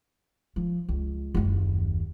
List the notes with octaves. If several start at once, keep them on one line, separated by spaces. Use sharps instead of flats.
F3
C#2
F#1 D#2